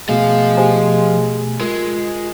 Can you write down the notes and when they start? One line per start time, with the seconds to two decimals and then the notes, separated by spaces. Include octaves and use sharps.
0.09 B2 F3 G#3 A3 F5
0.57 G4 C5 G#5
1.61 G#3 F4 A#4